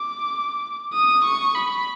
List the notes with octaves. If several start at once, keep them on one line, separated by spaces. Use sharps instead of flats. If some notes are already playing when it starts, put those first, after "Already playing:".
Already playing: D6
D#6
C#6
B5